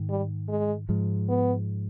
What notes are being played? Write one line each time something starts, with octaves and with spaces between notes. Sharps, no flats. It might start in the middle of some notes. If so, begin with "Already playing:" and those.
Already playing: G#2 D#3
G3
G#3
G#2 F3 G#3
B3